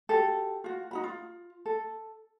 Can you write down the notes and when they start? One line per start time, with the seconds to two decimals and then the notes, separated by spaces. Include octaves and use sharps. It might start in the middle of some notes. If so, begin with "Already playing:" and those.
0.09 F#4 G4 A4
0.64 F4 F#4
0.91 D#4 F#4 B5
1.04 F4
1.66 A4